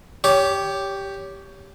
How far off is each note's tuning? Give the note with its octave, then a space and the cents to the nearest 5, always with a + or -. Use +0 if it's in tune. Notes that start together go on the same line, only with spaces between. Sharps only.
G4 +0 C#5 +25